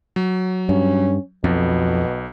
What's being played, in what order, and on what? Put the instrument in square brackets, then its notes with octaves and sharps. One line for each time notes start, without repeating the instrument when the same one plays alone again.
[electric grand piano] F#3
[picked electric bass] G2 [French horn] C#4
[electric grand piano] B1 [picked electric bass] F2 [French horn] B2